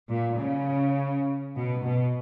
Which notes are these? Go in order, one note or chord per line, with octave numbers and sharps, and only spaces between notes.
A#2
C#3
B2
B2